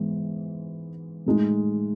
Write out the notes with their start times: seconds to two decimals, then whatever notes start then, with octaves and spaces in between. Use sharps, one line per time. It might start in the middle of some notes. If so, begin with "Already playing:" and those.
Already playing: G#2 E3 G#3 B3
1.26 A2 G#3 D#4